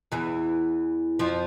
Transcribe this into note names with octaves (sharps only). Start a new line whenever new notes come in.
E2 E3
F2 F3